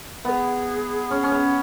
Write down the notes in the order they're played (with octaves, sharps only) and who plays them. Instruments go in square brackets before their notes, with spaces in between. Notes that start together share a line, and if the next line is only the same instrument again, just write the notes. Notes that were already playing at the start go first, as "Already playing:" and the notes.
[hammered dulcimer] B3 [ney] G#4 B4
[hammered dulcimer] C#4
C#4
B3